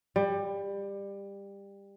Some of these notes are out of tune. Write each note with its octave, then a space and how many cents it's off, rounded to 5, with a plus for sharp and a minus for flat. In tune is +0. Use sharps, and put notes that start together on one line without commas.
G3 +20